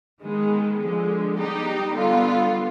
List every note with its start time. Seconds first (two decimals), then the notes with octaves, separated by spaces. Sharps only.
0.21 D#3 G#3 B3
0.80 D3 F3 G#3
1.38 G3 B3 D#4 G4
1.96 D3 G3 B3 F4